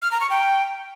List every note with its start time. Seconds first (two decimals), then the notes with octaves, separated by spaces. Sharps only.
0.02 F6
0.11 A#5
0.21 C#6
0.30 G5